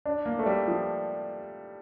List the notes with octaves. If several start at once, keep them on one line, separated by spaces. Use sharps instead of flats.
D4
A#3
A3
G3
F3